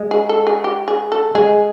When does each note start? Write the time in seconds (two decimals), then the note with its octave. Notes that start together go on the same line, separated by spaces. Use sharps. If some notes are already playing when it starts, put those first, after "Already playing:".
Already playing: G#3
0.11 G#4
0.29 A4
0.47 G#4
0.64 G4
0.88 G#4
1.12 A4
1.35 G#3 G#4